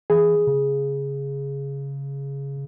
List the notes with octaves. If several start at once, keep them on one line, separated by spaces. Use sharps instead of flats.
E3 G#4
C#3